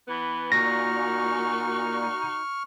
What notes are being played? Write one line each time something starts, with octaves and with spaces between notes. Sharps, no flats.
E3 B3
A#2 D#4 F#4 C#6 F6 A#6